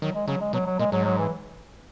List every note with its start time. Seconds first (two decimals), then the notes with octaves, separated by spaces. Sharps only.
0.01 D#3 F#3
0.15 G#3
0.27 C#3 F#3
0.40 G#3
0.53 B2 F#3
0.66 F#3
0.79 A#2 G#3
0.92 G#2 F#3
1.05 F#3
1.18 E3